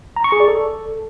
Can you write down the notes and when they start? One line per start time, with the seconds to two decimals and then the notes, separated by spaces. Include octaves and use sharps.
0.16 A#5
0.24 C#6
0.32 G#4
0.40 D5
0.48 A4